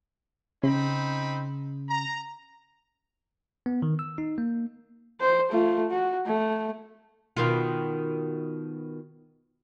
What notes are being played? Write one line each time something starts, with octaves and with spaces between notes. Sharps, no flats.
C#3 C4 D#4 B5
A#5
B3
D#3
E6
D#4
A#3
C5
A3 F4
F#4
A3
B2 D#3 F4